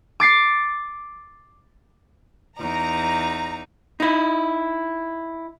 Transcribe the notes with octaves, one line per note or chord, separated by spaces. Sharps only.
D6 A6 C7 C#7
E2 D#4 A#5
D#4 E4